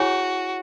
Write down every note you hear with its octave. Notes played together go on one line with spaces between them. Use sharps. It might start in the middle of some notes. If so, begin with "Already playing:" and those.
Already playing: E4 F#4 G#4 C#5 G#5